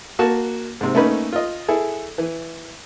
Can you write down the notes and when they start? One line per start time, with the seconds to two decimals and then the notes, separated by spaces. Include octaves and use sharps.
0.19 A#3 F#4 A5
0.81 G#2 C3
0.95 A3 A#3 C#4 D#4 B4
1.33 F4 D#5
1.68 E4 G#4 A4
2.18 E3